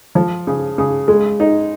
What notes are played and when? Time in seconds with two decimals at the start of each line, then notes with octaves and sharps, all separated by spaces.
0.15 F3
0.47 C#3
0.78 C#3
1.08 G#3
1.40 D#4